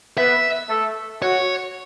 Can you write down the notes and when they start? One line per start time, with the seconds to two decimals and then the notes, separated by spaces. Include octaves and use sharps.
0.17 B3 B4 E5
0.70 A3 A4
1.22 F#4 C#5